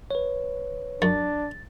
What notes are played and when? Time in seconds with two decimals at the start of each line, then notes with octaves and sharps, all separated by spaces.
0.11 B4 C#5
1.02 F#2 D4 A6